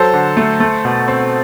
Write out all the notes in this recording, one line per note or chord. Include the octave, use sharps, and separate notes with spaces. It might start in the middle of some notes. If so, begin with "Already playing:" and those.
Already playing: F#3 A4 C5
D3
A3
A3
B2
C4